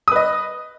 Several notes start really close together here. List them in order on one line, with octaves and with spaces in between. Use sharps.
D#6 B4 D#5